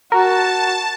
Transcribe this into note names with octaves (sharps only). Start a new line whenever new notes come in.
F#4 A#4 A5